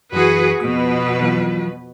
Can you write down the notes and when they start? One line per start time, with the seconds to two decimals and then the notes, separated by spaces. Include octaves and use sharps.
0.13 F#2 E3 F#4 G#4 B4
0.60 F2 B2 B4 D#6
1.21 E3 F#3 F4